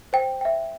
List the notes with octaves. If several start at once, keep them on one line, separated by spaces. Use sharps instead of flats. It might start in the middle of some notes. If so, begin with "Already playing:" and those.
C5 G5
E5 G5